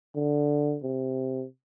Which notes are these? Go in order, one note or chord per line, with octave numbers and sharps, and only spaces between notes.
D3
C3